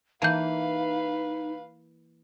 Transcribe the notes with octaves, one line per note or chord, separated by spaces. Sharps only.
E3 A#3 D#4 B4 F5 A5 G6